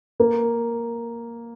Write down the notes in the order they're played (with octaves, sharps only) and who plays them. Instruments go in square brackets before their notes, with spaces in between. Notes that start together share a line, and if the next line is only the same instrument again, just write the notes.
[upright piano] A#3